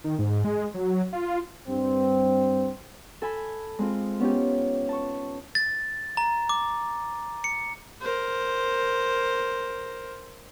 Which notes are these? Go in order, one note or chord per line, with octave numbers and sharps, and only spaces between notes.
D#3
G#2
G#3
F#3
F4
G2 C4
A4 G#5 B5
G#3 C4 F4
B3 C#4 D#4 G4
A5 C#6
A6
A#5
D6
C#7
A#4 C5